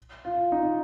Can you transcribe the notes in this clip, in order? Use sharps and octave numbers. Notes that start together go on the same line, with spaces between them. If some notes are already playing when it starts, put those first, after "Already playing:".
F4
D#4